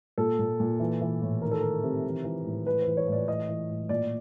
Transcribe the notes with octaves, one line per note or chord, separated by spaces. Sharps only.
A#2 A4
A#2
A#2
E3
E3
A2
D#3 A#4
A4
D#3 A#4
C3
E3
E3
A2
E3 B4
E3 C5
C#5
A2 D5
E3 D#5
E3
A2
A#2 D5